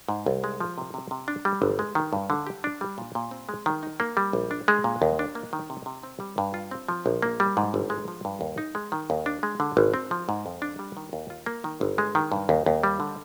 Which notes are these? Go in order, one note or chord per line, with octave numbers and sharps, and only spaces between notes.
G#2
C2
G#3
F3
C3
C3
C3
D4
G3
G1
G#3
D#3
G2
D3
G4
D4
G3
A#2
A#2
C4
G#3
D#3
D#4
A#3
G3
A#1
D4
G#3
A#2
D#2
D4
A#3
D#3
C3
C3
C4
G3
G2
F4
C4
F3
A#1
A#3
G3
G#2
G1
G#3
F3
G2
D#2
D#4
G#3
D#3
D#2
D4
G#3
D3
G#1
C4
F3
G#2
F2
D4
G3
D#3
D#2
F4
A#3
D#3
G1
G#3
D#3
G2
D#2
D#2
G3
D3